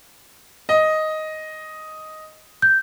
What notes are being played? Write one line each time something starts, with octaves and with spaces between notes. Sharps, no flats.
D#5
G6